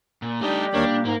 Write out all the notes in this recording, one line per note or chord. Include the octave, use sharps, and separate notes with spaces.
A#2
G3 A3 D4 D#4 G4 D#5
D#2 A#3 D4 A#4 C#5
A#2
G#2 A#3 A#4